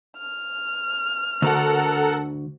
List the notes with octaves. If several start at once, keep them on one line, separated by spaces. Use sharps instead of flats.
F6
D2 D3 A4 A#4 F#5